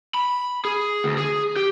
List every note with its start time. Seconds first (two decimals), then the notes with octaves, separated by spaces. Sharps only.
0.14 B5
0.65 G#4
1.04 D2
1.18 G#4
1.56 G4